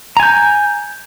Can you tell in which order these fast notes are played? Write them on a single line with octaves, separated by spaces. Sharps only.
A#5 G#5 G6